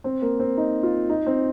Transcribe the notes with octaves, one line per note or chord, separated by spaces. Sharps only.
C4
A#3
C4
D#4
F4
D#4
C4